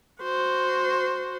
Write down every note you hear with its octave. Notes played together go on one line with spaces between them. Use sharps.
F#4 C5